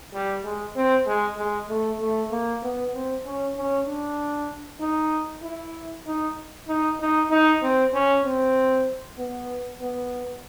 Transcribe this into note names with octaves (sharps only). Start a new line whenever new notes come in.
G3
G#3
C4
G#3
G#3
A3
A3
A#3
B3
C4
C#4
C#4
D4
D#4
E4
D#4
D#4
D#4
D#4
C4
C#4
C4
B3
B3